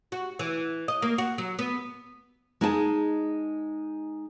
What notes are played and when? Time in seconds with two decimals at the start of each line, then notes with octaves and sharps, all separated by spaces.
0.12 F#4
0.39 E3
0.88 D#5
1.02 A#3
1.18 F#4
1.38 F#3
1.59 B3
2.61 G#3 D#4 G#4 G#5 A5